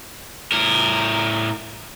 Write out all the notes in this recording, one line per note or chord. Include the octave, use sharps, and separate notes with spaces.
A2 A#4